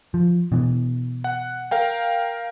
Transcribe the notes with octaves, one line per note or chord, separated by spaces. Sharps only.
F3
B2 E3
F#5
A#4 F5 G5